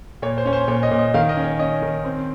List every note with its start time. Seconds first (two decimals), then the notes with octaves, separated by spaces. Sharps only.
0.22 A#2 C#5
0.38 C5
0.45 C#4 C#5
0.53 C5
0.68 A#2 C#5
0.83 D#5
0.91 A#2
0.99 D#5
1.14 D#3 F5
1.29 D#5
1.37 C#4
1.43 C#5
1.59 C#4 D#5
1.82 D#3
2.04 C4